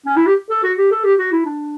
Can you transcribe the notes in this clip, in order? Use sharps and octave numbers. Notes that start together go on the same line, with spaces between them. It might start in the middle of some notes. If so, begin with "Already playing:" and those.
C#4
E4
G4
A4
F#4
G4
A4
G4
F#4
E4
D4